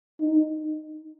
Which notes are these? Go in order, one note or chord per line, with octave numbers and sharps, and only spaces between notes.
D#4